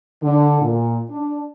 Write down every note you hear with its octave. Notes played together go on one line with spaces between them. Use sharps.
D3
A#2
D4